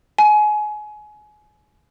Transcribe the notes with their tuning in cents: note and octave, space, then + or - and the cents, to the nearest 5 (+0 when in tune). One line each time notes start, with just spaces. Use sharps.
G#5 +25